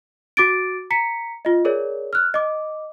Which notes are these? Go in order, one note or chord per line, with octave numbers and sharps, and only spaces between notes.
F#4 D6 A6 D7
A#5 B6 C#7
F4 D#5
G#4 A#4 C#5 D5
F6 F#6
D#5 D6